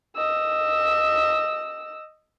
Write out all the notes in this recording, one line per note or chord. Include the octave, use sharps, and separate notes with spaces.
D#5 E6